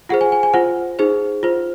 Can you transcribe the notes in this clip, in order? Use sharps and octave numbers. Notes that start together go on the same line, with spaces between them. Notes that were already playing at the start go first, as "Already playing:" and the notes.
F4 G#4 C5 F#5
G#5
G#5
G#5
F4 C5 F#5
D#4 G#4 C5
F4 C5